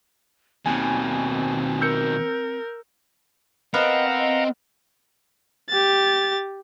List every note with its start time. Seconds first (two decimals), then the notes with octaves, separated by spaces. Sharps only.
0.66 D#2 B2 D#3 C4 G#5
1.81 A#4 E6 G6 C#7
3.74 B3 C4 A#4 B4 D#5 F5 F#5 A#5
4.18 D#5
5.69 G4 A6